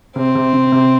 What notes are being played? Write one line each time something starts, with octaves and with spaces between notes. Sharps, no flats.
C3 C4
C3
C3
C3